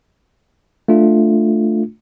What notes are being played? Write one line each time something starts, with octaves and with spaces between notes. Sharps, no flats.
A3 D4 F4